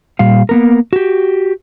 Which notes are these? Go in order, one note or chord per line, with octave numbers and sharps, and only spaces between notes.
A#2 G3 F5
A#3 B3 A#4
F#4 G4